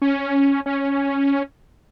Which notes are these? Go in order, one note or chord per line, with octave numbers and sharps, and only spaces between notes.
C#4
C#4